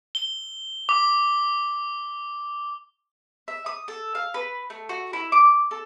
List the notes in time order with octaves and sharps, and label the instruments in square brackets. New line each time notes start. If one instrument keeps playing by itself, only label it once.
[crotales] G7
D6
[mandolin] E5
D#6
A4
F5
B4
A3
F#4
E4
D6
A4